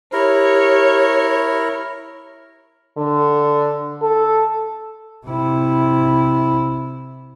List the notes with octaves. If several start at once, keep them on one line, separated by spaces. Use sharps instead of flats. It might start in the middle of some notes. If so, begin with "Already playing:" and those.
E4 G4 A#4 C#5
D3
A4
C3 E4